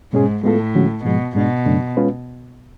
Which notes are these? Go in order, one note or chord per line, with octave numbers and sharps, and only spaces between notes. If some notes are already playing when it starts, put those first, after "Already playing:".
G#2 B2 G#3 C#4 G#4
A2 G#3 B3 F4 A4
D3 F3 G#3 C#4 F#4
G#2 B2 F3 G#3
G#2 B2 G#3 D4
F#2 C#3 F#3 A3 D4
G#3 C#4 F4 B4